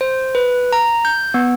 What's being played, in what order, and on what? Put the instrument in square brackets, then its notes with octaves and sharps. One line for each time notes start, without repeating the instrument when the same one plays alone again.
[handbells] C5
B4
A#5
G6
B3